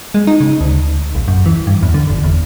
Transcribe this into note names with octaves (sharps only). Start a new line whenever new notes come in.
G#3
D#4
C#3
D2
A#1
F#2
E3
G2
E2
D3
G1
E2